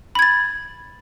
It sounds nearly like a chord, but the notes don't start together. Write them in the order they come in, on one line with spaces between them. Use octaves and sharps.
B5 G#6 A6